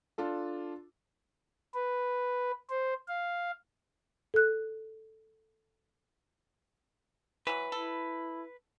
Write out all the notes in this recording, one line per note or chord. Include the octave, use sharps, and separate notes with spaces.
D4 F4 A4
B4
C5
F5
A4 F#6
E3 F#3 B4
E4 A4